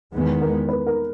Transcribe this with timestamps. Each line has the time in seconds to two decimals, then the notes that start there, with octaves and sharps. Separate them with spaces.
0.14 E2 D#3 G#3 B3
0.41 A#4
0.69 B4
0.87 A#4